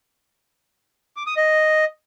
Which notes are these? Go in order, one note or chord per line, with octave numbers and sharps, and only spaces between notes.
D6
D#6
D#5